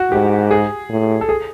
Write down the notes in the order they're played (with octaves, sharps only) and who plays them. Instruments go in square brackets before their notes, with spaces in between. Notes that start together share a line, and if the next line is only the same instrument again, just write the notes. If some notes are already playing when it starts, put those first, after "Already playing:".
Already playing: [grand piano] F#4
[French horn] G#2 [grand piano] G4
[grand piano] G#4
[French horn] A2
[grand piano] A4
G#4